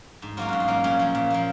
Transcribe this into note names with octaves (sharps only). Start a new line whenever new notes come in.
G#2
F#3 A#3 C#4 F4
G#2 F#4
F4
F#3 A#3 C#4
A#2 C#4
F3 A#3
A#2
F3 A#3